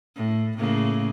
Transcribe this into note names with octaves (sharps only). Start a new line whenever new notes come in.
A2
A2 C#3 A#3